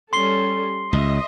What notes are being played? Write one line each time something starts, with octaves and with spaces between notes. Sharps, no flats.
G3 C#4 A4 C6 C7 G7
C#2 D#5 E5